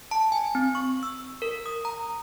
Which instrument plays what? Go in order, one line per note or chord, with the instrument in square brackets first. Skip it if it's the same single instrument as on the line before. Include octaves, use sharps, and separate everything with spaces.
[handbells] A5
G#5
C4
C#6
E6
A#4
D#6
A#5